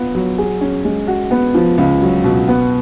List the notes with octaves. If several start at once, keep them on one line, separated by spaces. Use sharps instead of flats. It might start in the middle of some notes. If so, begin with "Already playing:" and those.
Already playing: B3 F4
F#3
G#4
C#4
G#3
F#4
B3
F3
C#2
F#3
B2
B3